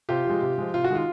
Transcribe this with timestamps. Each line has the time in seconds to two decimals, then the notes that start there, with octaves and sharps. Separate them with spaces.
0.09 C3 F4 G4
0.25 F3 G#3
0.42 C3
0.58 F3 G#3
0.74 C3 F4
0.84 F#4
0.90 D#3 G#3 F4